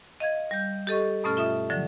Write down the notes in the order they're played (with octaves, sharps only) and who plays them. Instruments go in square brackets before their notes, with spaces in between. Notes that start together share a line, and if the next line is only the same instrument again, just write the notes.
[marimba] D#5 F5 G#6
G3 G6
G4 A4 D#5 C#6
G2 B2 A3 C#4 A4 F6
F4 E5 D#6
D3 F3 F#3